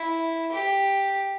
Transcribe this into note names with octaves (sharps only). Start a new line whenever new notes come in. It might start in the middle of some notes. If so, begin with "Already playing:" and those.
Already playing: E4
G4